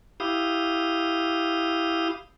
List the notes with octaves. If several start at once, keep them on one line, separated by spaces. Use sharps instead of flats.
E4 G4 F5 D#6